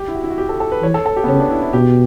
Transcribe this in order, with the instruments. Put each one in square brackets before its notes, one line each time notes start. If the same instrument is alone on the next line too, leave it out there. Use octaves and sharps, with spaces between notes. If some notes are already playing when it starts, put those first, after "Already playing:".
Already playing: [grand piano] G4
E4
F#4
E4
F#4
G4
A4
A4
B4
[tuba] E3 [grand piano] C#5
[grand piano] A4
A4
G4
B3
[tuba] C#3 [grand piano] C#4
[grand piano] D4
E4
E4
[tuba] B2 [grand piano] G4